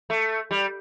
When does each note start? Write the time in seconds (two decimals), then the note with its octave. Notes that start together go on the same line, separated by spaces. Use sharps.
0.10 A3
0.51 G3